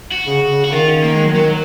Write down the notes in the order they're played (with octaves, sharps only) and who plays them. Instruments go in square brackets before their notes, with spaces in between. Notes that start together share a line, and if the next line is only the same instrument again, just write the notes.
[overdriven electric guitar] F#4
[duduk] C#3
C#3
[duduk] C#3 [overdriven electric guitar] F#4
[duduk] D#3 [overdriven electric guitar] F4
[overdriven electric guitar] C#4
A#3
G#3
F#3
F#3